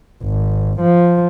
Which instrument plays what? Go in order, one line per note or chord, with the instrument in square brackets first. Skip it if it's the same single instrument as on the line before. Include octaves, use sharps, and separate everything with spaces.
[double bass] G#1
F3